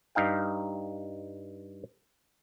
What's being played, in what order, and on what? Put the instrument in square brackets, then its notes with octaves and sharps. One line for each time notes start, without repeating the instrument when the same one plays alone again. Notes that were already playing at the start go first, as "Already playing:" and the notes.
[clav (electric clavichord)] G2 D#4 F5 G5